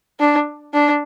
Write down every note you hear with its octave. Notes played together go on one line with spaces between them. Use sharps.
D4
D4